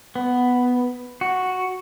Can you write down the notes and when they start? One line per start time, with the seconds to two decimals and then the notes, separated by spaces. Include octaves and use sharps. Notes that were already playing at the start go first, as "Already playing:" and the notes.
0.16 B3
1.21 F#4